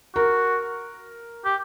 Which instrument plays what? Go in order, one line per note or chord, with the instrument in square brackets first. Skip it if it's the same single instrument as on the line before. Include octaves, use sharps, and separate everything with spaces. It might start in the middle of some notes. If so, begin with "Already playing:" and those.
[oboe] F#4 [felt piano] A#4
[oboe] G4